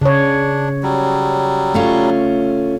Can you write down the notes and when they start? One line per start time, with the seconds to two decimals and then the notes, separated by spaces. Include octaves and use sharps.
0.01 C#3 D4 C#5
0.83 F#3 G3
1.74 A3 C#4 F4